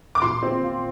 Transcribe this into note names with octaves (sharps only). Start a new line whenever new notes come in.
D6
A#2 C6
C4
F4